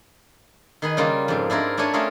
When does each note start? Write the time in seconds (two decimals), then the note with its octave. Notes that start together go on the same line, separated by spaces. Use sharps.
0.82 D#3 G#4 B4
0.97 C#3 G3 A#3 F4
1.28 F2 G#2 C4
1.50 D4 E4 F4 A#4
1.77 A3 D4 G4 A4 C#5 G#5
1.93 A3 C#4 F4 G4 G#4 A#4